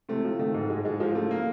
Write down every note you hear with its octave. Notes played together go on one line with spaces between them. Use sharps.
C3 A3
F3
D#3 A3
G#2
G#2 G#3
G#2 G#3
F3 G#3
C#3 A3
A#3